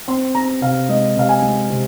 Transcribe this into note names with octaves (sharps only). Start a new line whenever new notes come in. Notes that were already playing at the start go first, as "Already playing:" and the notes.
C4 C6
C4 A#5
C3 F5
G#3 D#5
C3 F5
G#5
G#3
C3